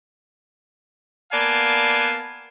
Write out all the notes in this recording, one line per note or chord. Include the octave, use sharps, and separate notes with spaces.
A#3 B3 D5 F5 G#5 A5